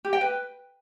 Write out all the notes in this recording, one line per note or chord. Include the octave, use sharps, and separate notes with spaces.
G4
G5
B4